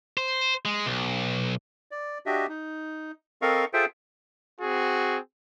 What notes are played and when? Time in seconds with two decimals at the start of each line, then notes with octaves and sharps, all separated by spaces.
0.17 C5
0.65 G#3
0.86 B1
1.91 D5
2.26 D4 F#4 G4 D#5 E5
2.49 D#4
3.42 C4 A4 A#4 D#5 F5 C#6
3.73 F4 G#4 A4 C5 E5 G5
4.60 C4 F#4 G#4